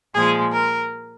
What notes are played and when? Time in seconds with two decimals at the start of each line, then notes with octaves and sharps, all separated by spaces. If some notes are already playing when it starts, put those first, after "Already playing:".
0.15 A#2 F3 G#3 G#4
0.53 A#4